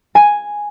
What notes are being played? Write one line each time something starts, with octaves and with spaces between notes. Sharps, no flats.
G#5